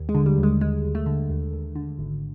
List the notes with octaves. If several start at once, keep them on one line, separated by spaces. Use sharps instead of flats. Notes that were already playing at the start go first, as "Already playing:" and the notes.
Already playing: D#2
G#3
D3
G3
D#2
G#3
D#2 G#3
D#2
A3
D3
D#2
D#2
D3
G#1